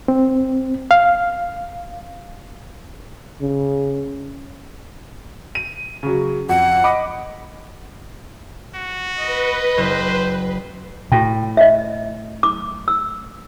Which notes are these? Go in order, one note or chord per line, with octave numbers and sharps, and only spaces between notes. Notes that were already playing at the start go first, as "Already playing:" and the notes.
C4
F5
C#3
D#7
C#3 F#3
F2 F#5
D#5 B5 D6
F#4
B4 D#5
F#1 C5
A2 F#4 G5
D#5 E5
D6
E6